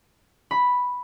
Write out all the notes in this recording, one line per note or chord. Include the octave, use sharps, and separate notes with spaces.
B5